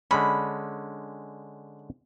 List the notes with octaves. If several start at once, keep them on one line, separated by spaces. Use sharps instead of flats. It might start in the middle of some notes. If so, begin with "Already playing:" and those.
D3 G#3 C#4 B5